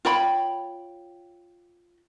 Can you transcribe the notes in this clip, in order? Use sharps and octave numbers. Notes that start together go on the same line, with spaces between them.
F4 C#5 G5 B5